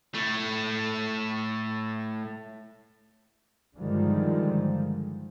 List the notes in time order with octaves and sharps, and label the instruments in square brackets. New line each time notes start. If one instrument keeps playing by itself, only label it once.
[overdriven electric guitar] A2 A3
[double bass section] G2 D3 D#3 F3 G3 G#3